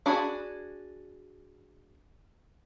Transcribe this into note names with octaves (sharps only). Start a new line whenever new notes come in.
D4 F#4 G#4 B5